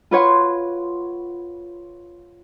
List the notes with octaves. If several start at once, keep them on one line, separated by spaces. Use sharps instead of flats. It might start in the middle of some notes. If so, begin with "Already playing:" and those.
F4 B4 C#5 F#5 C6